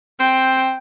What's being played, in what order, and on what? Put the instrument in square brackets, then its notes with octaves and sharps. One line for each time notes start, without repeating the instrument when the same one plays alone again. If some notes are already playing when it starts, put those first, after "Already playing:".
[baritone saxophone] C4 [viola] G5